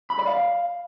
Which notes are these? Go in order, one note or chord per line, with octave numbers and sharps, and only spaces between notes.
B5
D5
F5